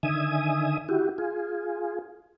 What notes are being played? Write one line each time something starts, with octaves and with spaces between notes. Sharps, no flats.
D3 D#3 E5 G#5 D#6
E4 F#4 G4
F4 G#4